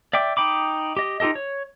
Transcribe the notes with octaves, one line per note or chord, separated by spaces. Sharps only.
D5 E5 G5 D6
D#4 G5 B5 D6
G4 D#5
D#4 F4 G4 A4 D#5
C#5